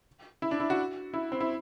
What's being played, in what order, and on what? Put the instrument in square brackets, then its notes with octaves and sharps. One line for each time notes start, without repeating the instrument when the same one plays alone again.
[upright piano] E4
D4
E4
F#4
E4
C4
E4